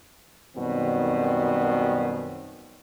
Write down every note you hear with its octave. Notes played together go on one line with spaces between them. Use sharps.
F#2 B2 D#3 G3 C4